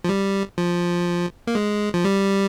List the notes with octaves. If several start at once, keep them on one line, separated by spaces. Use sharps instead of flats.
F3
G3
F3
A#3
G#3
F3
G3